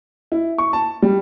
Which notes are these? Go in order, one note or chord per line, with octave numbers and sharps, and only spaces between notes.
E4
C#6
A5
G3